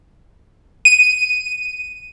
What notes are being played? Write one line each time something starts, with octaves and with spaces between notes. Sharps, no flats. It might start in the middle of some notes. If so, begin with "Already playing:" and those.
D#7